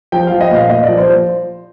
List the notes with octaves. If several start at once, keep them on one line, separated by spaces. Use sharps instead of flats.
F3 G5
F3 F5
D#5
A#2 F5
A#2 D#5
D5
F3
C5
F3